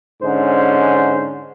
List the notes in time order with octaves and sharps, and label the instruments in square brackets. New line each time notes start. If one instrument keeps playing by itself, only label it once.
[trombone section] G#2 D3 C#4 C5